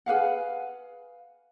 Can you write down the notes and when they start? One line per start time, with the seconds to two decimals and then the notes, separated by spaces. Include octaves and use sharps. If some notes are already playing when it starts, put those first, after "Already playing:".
0.06 G#4 B4 F5 F#5